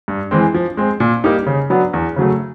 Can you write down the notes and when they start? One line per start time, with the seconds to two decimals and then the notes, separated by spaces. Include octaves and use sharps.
0.08 G2
0.31 E3 G#3 C4
0.55 F3
0.77 G#3 C4
1.00 A#2
1.24 G3 A#3 D#4 G4
1.47 C#3
1.70 F#3 B3 D4
1.93 E2
2.16 C#3 F#3 A3